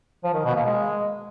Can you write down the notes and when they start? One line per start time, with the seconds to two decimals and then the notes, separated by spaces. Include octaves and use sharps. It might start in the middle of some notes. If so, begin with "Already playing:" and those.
0.24 F3
0.34 D#3
0.45 B2
0.55 A#3
0.66 G#3